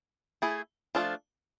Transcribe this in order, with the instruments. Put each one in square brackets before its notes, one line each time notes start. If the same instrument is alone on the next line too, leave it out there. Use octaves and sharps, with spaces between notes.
[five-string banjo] A3 E4 G#4
F3 A3 D4 F4 A4